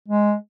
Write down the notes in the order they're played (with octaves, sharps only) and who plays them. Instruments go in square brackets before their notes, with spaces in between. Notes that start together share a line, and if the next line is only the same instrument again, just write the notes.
[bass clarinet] G#3